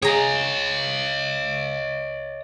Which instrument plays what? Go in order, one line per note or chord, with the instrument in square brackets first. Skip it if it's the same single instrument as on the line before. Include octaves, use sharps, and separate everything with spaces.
[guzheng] G#4 A#5 [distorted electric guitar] C#5 D#5